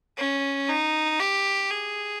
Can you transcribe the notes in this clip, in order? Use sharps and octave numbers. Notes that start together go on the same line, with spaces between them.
C#4
D#4
G4
G#4